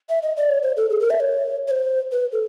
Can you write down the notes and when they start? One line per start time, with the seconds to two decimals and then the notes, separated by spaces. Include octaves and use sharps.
0.09 E5
0.23 D#5
0.37 D5
0.49 C#5
0.63 C5
0.77 A4
0.90 G#4
1.00 A#4
1.10 E5
1.20 C#5
1.68 C#5
1.71 C5
2.12 B4
2.32 A4